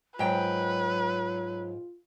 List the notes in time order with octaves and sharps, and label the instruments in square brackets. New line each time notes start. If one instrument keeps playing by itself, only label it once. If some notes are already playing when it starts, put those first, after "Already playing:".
[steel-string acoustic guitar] G#2 G5 [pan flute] F#3 [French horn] F4 [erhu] B4